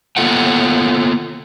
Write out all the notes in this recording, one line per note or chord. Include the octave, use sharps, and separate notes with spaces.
A#3 B3 F4 A4 F#5 G5